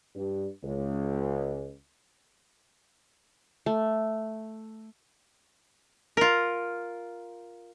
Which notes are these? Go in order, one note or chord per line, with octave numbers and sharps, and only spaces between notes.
G2
C#2
A3
F4 A#4